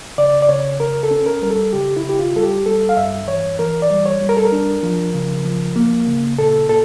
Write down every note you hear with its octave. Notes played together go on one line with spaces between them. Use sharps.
C#3 D5
D5
C#3 C#5
C#3 A#4
A4
C#4
A#4
G3 A#4
A4
C#3 G4
E4
C#3
G4
F4
G3 A4
G4
G3 A4
F5
G2 E5
E3 C#5
E3 A#4
D5
G3
C#5
G3
A#4
A4
A#4
D4
F3
C#3
F3
A#3
C#3
A#2 A4
A#2 A4